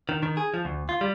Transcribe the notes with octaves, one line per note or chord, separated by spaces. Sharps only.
D#3
D#3
G#4
F3
D2
F4
G3